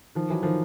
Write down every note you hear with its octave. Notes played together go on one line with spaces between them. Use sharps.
D#3 F3
E3 F#3
D#3 F3